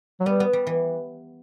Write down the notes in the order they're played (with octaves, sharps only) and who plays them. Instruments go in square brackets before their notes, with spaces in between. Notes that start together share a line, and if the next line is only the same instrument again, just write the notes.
[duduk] F#3
[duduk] G3 [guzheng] B3
[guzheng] B3
G3
E3